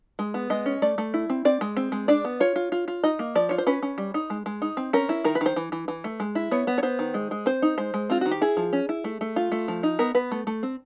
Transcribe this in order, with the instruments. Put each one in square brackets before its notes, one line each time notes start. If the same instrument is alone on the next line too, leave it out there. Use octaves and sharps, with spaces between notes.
[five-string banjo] G#3
B3
G#3 D#5
C#4
A3 D5
A3
E4
C4
C4 D5
G#3
C4
G#3
D4 D5
B3
F4 C#5
F4
F4
F4
D#4 D#5
A#3
F3 D5
F4 C#5
C5
C#4 B4
C#4
G3
D#4
G#3
G#3
D#4
C4
C#4 A#4
E4
D#3 A#4
B4
D#3 C5
E3
E3
E3
A3
G#3
E4
B3 C#5
B3
C#5
B3 C5
D#3
G#3
G#3
C4 C5
D#4
G#3 C5
G#3
C4 F4
D#3 F#4
G4
E4 G#4
F3
C#4
E4
A3
A3
F4
A3
F3
D#4
B3 A#4
B3 B4
A3
A3
C4